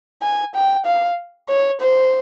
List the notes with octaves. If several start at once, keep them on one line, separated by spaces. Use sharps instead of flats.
G#5
G5
F5
C#5
C5